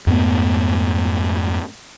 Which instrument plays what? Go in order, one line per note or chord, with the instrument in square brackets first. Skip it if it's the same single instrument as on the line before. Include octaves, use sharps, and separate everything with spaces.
[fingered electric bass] F2 G#2 A3 B3